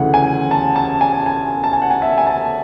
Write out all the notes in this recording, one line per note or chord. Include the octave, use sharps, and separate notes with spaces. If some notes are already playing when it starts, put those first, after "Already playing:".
Already playing: D2 C#3 E3 F#5
G#5
A5
A5
G#5
G#5
A5
G#5
F#5
G#5
E5
G#5
A5